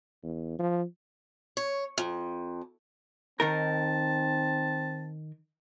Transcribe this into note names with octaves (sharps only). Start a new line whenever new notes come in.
E2
F3
C#5
F2
D#3 C4 D#4 A#4 A5